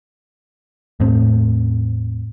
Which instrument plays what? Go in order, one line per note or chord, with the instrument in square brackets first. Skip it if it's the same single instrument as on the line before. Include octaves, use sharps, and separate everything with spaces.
[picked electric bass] E2 A2 A3 C4